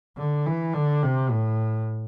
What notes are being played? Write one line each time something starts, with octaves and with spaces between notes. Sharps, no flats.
D3
E3
D3
C3
A2